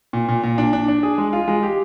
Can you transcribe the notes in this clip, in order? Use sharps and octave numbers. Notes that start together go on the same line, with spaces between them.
A#2
A#2
A#2
D4
D4
D4
G#4
G#3
F4
G#3
G4